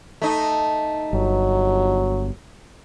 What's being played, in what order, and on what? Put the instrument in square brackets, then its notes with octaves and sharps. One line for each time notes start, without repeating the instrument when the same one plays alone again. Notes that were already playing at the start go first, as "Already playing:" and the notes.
[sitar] A3 D#4
[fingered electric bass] G1 [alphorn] F#3